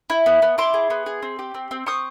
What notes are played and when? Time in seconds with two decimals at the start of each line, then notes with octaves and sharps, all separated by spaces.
0.10 E4
0.26 B3
0.42 B3
0.58 E4 C6 D6
0.74 G#4
0.90 B3
1.06 G#4
1.23 C4
1.39 G4
1.55 C4
1.71 C4
1.86 C4 C#6 D#6